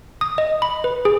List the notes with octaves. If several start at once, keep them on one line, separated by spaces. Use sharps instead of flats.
D#6
D#5
B5
B4
G#4